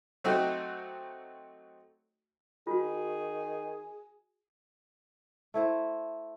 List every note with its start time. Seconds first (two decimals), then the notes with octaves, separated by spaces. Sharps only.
0.24 F#3 A3 C4 D#4 F#4 G4
2.67 D#3 F4 F#4 G#4
5.54 A3 E4 C5